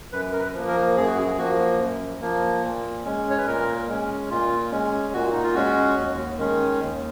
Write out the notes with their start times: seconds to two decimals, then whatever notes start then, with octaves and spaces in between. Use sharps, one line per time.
0.12 F#2 B4
0.33 A#4
0.40 B4
0.54 F3 A#3
0.68 A#4
0.96 F#2 G#4
1.07 F#4
1.18 G#4
1.38 F3 A#3 F#4
1.79 F#2
2.21 F3 A#3
2.62 A#2
3.05 G#3 C#4
3.30 C#5
3.38 B4
3.46 A#2 A#4
3.88 G#3 C#4
4.30 A#2 F4
4.71 G#3 C#4
5.13 A#2 F#4
5.32 D#4
5.43 F4
5.54 G#3 C#4 F#4
5.96 D#2
6.38 D#3 G#3 C#4
6.80 D#2